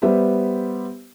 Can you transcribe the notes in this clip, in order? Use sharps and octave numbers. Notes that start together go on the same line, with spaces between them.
G3 B3 G4 C5 E5